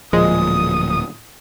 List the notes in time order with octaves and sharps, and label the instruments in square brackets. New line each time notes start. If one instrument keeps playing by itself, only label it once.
[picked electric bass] D1 A#2 [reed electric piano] F3 [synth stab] G#3 [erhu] D#6